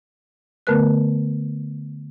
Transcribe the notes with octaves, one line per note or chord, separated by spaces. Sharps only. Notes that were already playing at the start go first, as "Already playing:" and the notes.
D3 A3 B3 A#4 B4 F#6